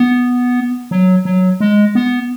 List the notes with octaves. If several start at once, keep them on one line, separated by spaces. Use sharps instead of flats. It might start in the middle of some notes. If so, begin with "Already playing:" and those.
Already playing: B3
F#3
F#3
G#3
B3